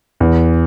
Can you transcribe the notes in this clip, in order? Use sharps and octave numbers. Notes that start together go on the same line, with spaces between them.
E2